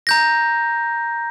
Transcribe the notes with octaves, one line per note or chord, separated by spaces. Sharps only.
A#5 G6 A#6